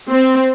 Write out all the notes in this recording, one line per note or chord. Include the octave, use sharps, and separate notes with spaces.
C4